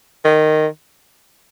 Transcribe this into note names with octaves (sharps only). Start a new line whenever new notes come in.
D#3